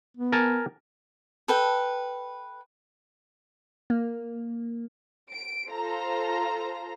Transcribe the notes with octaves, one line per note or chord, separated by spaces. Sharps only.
B3
A#4 G#5 A5
A4 B4 G5
A#3
D7
F4 A4 C5 A#5